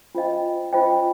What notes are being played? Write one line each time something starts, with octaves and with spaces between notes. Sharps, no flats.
C#4 F4 C5 D#5 G5
C#4 F4 C5 D#5 G5